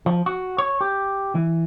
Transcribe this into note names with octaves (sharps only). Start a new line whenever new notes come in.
F3
F#4
C#5
G4
E3